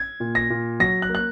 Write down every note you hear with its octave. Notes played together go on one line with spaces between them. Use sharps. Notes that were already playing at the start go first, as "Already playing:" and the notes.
Already playing: G#6
A#2
A#6
A#2
F#3 A#6
F#6
A#3
F#6